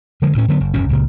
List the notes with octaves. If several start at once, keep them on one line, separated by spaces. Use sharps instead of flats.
D3 F3 G#3
D2 A2 C#4
D3 F#3 B3
F#1
F#1 E2 B2 C#4
C#2 A#2 C#3